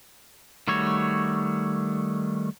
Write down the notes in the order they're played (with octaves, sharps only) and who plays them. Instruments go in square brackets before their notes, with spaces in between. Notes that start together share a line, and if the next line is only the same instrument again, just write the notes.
[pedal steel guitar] D#3 G3 A3 F#4 C#5